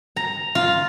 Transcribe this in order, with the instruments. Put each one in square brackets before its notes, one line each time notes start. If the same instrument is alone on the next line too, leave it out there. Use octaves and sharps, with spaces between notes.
[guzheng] A#5
F4